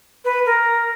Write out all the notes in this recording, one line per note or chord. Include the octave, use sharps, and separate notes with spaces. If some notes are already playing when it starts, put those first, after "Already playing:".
B4
A#4